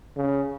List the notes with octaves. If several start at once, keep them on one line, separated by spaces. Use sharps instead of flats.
C#3